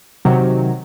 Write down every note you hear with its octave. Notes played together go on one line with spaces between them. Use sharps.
C3 D#3 F#3